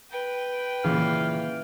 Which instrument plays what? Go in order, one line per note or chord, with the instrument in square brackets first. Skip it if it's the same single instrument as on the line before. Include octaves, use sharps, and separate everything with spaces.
[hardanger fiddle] B4 G5
[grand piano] A#2 C#3 [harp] E3 [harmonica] F5